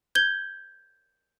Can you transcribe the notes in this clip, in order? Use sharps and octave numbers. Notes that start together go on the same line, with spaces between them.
G6 G#6 G7